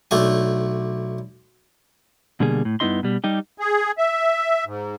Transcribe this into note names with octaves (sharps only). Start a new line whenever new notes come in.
B1 A3 D4 G#5
B2 D3 G3 A#3 G#4
A2
G2 B3 D#4 E4 D#5 C6
B2 G3
G3 D#4 G4
G#4
E5
G#2